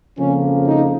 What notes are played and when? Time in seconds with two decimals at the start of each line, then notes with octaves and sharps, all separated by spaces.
0.18 F2 C#3 F3 A#3 C#4
0.66 D#4